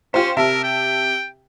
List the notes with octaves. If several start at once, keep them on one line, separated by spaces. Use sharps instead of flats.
C#4 F4 G4 C5
C3 A#4 E5 A5
G5